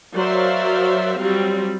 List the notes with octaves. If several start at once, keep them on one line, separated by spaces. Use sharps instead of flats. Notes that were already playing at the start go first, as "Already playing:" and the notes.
F#3 A#4 C5 D5 E5 F5
F#3 G3 C4 F4 G4